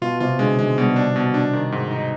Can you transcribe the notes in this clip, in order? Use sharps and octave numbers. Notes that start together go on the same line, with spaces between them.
B2 F4
C3 F4
D3 G#3
D#3 G#3
B2 G3
D4
B2
D4
D#3
G#2
D#4